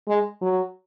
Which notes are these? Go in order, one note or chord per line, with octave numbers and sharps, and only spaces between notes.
G#3
F#3